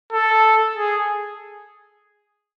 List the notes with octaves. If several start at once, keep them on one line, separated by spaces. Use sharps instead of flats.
A4
G#4